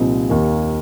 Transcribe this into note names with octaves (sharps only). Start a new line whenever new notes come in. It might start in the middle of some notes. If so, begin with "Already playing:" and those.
Already playing: C2 A#2 F3 C4 D#4
D#2 D#3 A#3